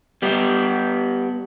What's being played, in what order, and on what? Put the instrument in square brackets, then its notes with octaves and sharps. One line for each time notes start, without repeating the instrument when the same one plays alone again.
[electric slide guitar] G3 B3 G4